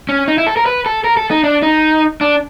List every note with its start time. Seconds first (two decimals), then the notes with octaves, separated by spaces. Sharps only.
0.09 C#4
0.28 D#4
0.38 E4
0.47 A4
0.57 A#4
0.66 B4
0.86 A4
1.04 A#4
1.17 A4
1.31 D#4
1.44 D4
1.62 D#4
2.21 D4